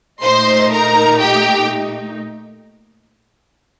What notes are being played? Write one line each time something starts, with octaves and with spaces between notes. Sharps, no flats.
A#2 A3 D#4 C5 C6
A#4 A#5
G4 G5